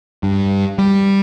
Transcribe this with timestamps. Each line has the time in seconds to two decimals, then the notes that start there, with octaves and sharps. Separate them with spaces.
0.23 G2
0.78 G3